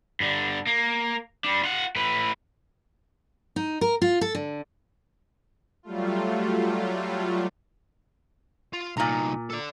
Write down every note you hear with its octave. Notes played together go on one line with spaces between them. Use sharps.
G2 D3
A#3
G3 D4
F4 F#5
A2 B4
D#4
A#4
F4
A4
D3
F#3 G3 A3 F4
F4
C2 A#2 D#4 A#5
A4 D5